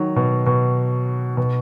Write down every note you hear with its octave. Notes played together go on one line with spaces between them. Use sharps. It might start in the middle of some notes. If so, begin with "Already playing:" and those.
Already playing: D#3 F#3
B2
B2
B2